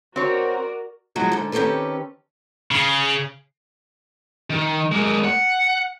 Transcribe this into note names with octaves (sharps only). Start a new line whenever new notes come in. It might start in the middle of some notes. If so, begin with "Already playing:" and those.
C4 F#4 A#4 C#5 D5
B2 F3 F#3 G#3 E4 F#4
G#2 D3
D#3 C4 C#4 G4 A4 B4
C#3
D#3
G#3 A#3
F#5